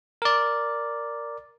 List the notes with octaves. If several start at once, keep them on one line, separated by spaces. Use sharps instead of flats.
A#4 D5